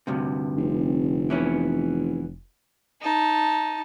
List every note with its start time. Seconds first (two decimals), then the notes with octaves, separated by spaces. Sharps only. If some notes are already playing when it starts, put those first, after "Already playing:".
0.07 D2 G2 C3
0.57 F1
1.30 E3 B3 C#4
3.02 D#4 A5